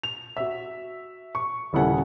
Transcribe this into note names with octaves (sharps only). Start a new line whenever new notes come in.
F7
F#4 E5
C#6
D#1 C#3 E4 A4 F#5 G#5